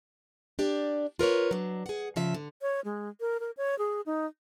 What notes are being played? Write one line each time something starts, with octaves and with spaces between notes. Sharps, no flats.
D4 G4 D5
F4 A#4 B4 C#5
F#3 D4
G#4 F#5
C#3 F3 E5
D3
C#5
G#3
A#4
A#4
C#5
G#4
D#4